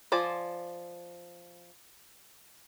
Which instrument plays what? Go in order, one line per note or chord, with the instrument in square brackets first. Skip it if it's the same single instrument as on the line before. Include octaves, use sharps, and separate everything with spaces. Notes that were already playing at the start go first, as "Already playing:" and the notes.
[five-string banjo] F3 C5 D5 G#5